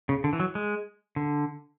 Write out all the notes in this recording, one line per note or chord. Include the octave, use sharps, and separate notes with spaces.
C#3
D3
E3
F#3
G#3
D3